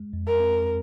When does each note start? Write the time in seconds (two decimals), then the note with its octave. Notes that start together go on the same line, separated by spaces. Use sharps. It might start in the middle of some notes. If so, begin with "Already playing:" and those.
Already playing: G#3
0.13 F2
0.27 A#4
0.40 C4